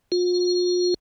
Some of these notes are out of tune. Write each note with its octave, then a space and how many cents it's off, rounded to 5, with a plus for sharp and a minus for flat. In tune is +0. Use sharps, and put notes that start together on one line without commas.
F4 +40